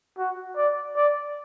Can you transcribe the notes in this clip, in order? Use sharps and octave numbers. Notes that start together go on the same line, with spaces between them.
F#4
D5
D5